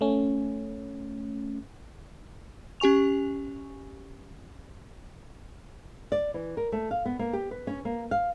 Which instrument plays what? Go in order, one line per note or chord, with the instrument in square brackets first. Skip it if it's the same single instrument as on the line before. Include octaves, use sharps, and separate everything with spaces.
[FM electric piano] A3 C#4
[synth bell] C#4 G4 G#5 C#6 F7
[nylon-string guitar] D5
E3
A#4
A3
F5
B3
A#3
G4
B4
C#4
A#3
F5